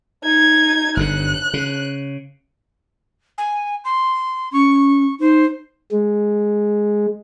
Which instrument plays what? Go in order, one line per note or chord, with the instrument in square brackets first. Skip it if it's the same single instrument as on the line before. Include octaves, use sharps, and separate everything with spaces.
[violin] D#4 G#6
[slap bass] G1 G2 D3 [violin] F#6
[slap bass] C#3
[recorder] G#5
C6
[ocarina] C#4 [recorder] C#6
[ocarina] D#4 [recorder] C5
[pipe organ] G#3